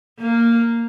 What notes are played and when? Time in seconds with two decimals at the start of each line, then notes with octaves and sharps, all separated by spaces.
0.19 A#3